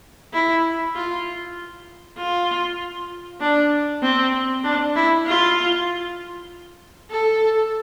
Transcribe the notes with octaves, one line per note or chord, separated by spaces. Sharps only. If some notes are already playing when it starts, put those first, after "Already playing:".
E4
F4
F4
D4
C4
D4
E4
F4
A4